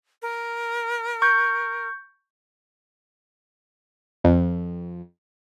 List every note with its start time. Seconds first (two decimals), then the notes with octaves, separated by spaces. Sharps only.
0.22 A#4
1.22 C#6 G6
4.24 F2